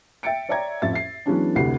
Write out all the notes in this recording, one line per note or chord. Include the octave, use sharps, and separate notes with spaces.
E5 G5 A6 C#7 D7
C#5 D5 E5 G5 A#5 G#6
A1 F2 E5 A6
E5 C7
E3 F#3 G#3 B3 C#4 D4
F1 D2 C3 E4 F#5 C7